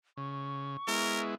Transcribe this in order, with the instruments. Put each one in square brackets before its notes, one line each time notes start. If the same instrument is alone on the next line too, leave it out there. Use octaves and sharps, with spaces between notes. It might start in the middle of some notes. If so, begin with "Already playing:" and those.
[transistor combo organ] C#3 [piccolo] C#6
[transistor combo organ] G#3 B3 E4 [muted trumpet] A#4